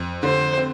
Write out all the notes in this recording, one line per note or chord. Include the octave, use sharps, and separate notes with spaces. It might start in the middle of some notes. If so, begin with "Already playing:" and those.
Already playing: F2
D3 C5
C4